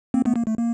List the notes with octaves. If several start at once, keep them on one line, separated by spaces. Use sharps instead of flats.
A#3 C4
A3 B3
A#3
A3
A#3